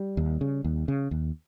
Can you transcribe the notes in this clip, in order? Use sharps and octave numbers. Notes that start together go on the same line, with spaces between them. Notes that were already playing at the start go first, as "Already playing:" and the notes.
Already playing: G3
D#2
C#3
D#2
C#3
D#2